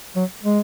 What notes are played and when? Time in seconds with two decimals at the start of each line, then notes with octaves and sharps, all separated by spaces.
0.16 F#3
0.44 G#3